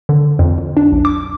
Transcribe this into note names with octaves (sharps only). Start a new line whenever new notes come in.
D3
F2
F2
D4
B1
D6